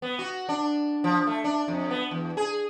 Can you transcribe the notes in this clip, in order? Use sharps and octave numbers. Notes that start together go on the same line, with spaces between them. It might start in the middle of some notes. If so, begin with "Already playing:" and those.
B3
F#4
D4
F3
A3
D4
F2
B3
E2
G#4